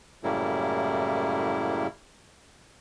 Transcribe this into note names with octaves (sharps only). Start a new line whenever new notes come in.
F#2 A2 C#3 G3 A#3 E4